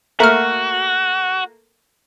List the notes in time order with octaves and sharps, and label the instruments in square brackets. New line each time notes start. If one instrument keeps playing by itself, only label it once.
[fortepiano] A3 A#3 A#4 [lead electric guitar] F#4 [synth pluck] E5 F6